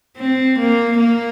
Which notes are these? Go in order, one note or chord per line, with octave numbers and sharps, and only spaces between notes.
C4
A#3
A#3